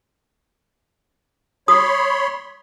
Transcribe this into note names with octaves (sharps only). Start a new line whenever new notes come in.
C#5 B5 C6 D#6